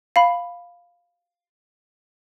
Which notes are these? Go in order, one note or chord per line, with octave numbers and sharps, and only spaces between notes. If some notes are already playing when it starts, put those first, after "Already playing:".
F5 B5